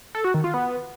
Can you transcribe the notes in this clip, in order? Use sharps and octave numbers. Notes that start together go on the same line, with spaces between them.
A4
F#4
D#3
F4
B3